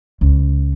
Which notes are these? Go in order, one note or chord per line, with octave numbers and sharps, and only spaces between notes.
C#2